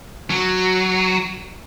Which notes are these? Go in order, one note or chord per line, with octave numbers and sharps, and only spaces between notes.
F#3